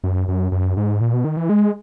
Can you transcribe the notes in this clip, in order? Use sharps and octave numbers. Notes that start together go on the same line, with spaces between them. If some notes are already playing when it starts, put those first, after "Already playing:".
F#2
F#2
F#2
G#2
A#2
B2
D#3
E3
G#3